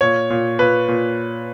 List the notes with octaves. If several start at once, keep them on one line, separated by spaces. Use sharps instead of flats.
A#2 C#5
A#2
A#2 B4
A#2